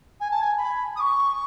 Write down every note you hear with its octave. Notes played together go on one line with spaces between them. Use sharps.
G#5
A5
G#5
B5
D#6
C#6